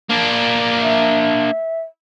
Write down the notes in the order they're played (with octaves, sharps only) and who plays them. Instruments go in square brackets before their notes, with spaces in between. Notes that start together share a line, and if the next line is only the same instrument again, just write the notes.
[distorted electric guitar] A#3 D4
[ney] E5